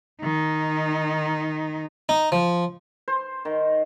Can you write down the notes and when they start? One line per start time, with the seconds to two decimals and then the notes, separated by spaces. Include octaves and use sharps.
0.22 D#3 D#4
2.09 D#4
2.32 F3
3.08 C5
3.45 D#3